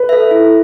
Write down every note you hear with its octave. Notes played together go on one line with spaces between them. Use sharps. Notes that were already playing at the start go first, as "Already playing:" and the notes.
Already playing: B4
A4 E5
E4